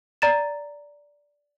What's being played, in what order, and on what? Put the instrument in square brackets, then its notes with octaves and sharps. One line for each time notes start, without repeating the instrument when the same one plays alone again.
[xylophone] D5 A#5 A6 E7